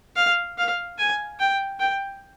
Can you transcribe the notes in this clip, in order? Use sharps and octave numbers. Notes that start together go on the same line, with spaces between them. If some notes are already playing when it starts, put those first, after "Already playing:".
F5
F5
G#5
G5
G5